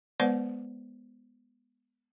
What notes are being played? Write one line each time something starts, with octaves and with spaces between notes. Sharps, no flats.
G#3 B3 B4 C5 D5 F#5